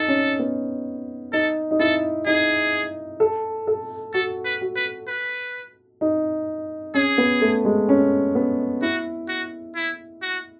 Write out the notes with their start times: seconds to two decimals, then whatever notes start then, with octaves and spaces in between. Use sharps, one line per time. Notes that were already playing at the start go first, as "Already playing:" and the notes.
Already playing: D#4 A4
0.08 C#4
0.39 B3
1.33 D#4 A4
1.71 D#4
1.80 E4 A4
2.26 D#4 G#4
3.20 A4
3.67 A4
4.14 F#4 A4
4.45 B4
4.61 F#4
4.76 B4
5.07 B4
6.01 D#4
6.94 C#4 G#4
7.18 B3
7.41 A3
7.65 G#3
7.89 C#4
8.35 B3
8.82 E4 F#4
9.28 F#4
9.76 E4
10.22 F#4